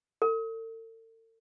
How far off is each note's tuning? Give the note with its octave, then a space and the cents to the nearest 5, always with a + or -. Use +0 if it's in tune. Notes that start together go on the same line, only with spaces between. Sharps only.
A4 +45